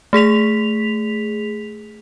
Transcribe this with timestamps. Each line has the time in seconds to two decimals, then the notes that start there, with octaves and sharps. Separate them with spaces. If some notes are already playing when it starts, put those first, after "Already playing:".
0.13 A3 G#4 B6 F7